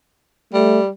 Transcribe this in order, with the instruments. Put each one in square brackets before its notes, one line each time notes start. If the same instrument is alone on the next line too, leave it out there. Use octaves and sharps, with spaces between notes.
[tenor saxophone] G3 [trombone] A3